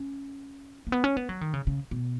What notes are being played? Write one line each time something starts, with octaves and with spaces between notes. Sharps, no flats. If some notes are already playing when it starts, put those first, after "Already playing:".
Already playing: C#4
A#3
B3
C#4
B3
F#3
D#3
C#3
C#3
B2